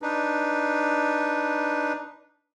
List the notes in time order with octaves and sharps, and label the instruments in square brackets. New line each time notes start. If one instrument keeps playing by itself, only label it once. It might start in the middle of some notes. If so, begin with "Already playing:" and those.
[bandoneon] D4 D#4 B4